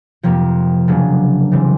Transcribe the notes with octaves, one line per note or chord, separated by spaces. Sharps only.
F2 C3 F3 A#3
C#3 F#3 A#3 D4
C#3 E3 G3 C4